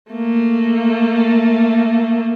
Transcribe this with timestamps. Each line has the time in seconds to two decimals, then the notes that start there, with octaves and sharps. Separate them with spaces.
0.11 A3 A#3